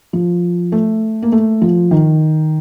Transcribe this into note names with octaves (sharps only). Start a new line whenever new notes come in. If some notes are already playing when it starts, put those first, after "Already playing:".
F3
A3
A#3
A3
F3
D#3